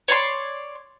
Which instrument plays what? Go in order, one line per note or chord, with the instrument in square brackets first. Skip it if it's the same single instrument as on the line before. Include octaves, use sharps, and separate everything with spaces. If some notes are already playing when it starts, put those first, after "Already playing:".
[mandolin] C#5 D5 A5 C6